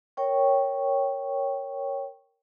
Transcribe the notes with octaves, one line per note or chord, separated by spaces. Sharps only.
A#4 C#5 G5 C#6